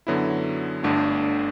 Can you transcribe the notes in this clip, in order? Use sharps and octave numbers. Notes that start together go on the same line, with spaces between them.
F#2 D3 F#3 B3 E4
G1 G2 D3 A3 D4